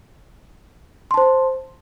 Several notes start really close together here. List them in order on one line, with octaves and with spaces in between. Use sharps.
C6 A5 C5